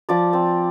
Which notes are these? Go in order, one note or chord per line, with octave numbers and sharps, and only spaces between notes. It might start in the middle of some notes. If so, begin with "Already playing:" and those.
F3 D5 D6
C4